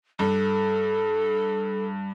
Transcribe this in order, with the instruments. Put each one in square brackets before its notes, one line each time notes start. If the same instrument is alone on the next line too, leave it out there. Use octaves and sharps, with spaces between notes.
[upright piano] G2 [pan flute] A4